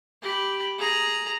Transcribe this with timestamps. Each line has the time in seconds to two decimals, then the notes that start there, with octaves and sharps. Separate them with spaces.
0.22 G4 B5
0.78 G#4 A#5